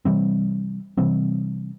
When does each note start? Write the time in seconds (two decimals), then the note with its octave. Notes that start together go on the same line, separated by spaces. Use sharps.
0.05 C3 E3 G3 C4
0.97 C3 E3 G3 C4